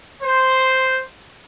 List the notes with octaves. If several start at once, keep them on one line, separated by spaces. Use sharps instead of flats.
C5